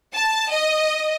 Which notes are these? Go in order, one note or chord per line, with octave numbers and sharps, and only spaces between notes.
A5
D#5